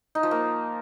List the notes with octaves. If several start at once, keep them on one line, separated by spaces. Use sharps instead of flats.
D#4
F3
A#3